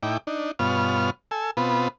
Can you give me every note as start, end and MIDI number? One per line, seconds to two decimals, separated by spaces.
0.03 0.17 45
0.03 0.17 63
0.03 0.17 64
0.03 0.17 79
0.03 0.17 86
0.27 0.51 62
0.27 0.51 63
0.59 1.10 43
0.59 1.10 47
0.59 1.10 59
0.59 1.10 65
0.59 1.10 73
0.59 1.10 89
1.31 1.51 69
1.31 1.51 80
1.31 1.51 88
1.57 1.88 47
1.57 1.88 59
1.57 1.88 60
1.57 1.88 65
1.57 1.88 71